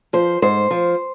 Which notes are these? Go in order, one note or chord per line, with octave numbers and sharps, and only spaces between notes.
F3 C5
G#2 C5
F3